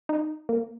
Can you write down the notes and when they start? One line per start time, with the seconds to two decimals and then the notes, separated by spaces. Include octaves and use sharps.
0.09 D#4
0.49 A#3